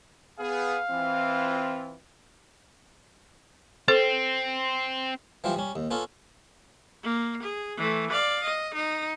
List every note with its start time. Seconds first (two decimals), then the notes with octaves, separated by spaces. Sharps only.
0.39 B3 G#4 F5
0.90 E3 C4 F4
3.88 C4 A4 C5
5.44 E3 F3 G3 F4 G4
5.56 G3 C#4
5.76 D#2
5.91 B3 C#4 F4 A4
7.03 A#3
7.43 G#4
7.77 E3 A3
8.11 D5 F5
8.44 D#5
8.74 D#4